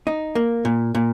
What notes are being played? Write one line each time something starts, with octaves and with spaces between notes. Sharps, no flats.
D#4
A#3
A#2
A#2